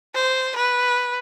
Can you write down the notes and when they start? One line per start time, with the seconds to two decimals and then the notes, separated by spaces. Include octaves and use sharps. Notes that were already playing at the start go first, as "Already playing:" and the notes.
0.15 C5
0.56 B4